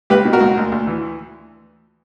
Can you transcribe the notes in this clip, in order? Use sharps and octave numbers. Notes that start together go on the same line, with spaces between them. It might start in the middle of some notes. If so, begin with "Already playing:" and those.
C#2 G4 B4
B2
F#4 A#4
C#2
D2
D2
E3